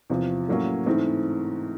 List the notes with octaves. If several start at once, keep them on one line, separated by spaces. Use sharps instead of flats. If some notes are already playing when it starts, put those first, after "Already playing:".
E2 C3 F3
A2 F#3 A#3 C#4
G#2 E3 A3 C4